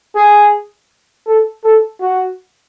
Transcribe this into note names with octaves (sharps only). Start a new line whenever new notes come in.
G#4
A4
A4
F#4